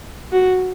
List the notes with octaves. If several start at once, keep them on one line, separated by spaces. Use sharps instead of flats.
F#4